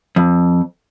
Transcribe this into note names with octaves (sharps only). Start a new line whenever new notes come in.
F2